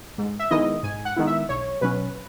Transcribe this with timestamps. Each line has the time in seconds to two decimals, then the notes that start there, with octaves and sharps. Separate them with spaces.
0.18 G#2
0.39 E5
0.51 D#3 G#3 B3 E4 D#5
0.83 G#2 G#5
1.05 F#5
1.16 D#3 G#3 B3 E4
1.27 E5
1.49 B1 C#5
1.81 B2 F#3 C#4 B4